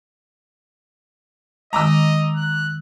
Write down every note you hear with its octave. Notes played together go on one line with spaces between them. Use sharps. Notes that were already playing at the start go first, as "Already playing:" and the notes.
D#3 G#3 D#5 A#5 D6 E6
F#6